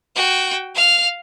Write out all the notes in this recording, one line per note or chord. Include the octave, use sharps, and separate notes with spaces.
F#4 G5
F5 F6